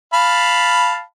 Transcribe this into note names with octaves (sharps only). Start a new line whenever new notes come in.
F5 A5 B5